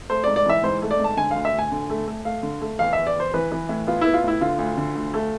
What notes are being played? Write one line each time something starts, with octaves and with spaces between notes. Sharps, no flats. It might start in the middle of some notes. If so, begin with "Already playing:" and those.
A3 C5
D5
G#2
D5
E3 E5
G#2 C5
A3
D5
G#2
A5
D3 G#5
F5
D2
E5
D2
G#5
D3
A3
A3
A3 F5
D3
A3
E2 F5
E2 E5
D5
E2 C5
E3 B4
E3
A2
B3 F4
B3 E4
F4
A2 E4
D3 F4
D2
D3
D2
A3